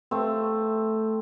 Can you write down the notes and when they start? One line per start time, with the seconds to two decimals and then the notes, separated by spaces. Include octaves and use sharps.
0.11 A3 C4